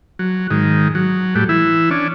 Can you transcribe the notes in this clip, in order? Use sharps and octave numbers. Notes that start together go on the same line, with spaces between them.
F#3
G#2 D#3
F#3
A2 G3
E3 E4
C#4 D4